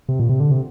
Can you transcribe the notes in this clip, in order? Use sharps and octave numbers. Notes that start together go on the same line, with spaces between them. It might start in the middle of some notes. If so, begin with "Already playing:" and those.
C3
A#2
C3
D3
C3